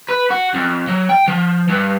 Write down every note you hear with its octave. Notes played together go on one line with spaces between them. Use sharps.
B4
F#4
F2
F#3
G5
F3
G2